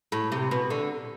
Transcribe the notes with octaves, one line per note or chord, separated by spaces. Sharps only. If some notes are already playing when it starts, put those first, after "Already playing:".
A2
C3
B2
D3